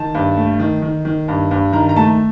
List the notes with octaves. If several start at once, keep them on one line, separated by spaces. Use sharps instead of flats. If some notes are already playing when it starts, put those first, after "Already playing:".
Already playing: D#3 A5
G2
A3
D#3
D#3
D#3
G2
G2
D#3 A#5
A#5
A3 A5